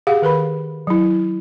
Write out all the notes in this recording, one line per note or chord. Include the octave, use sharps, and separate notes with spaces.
G4 G#4 F5 F#5
D#3 A#4 B4 B5
F#3 E4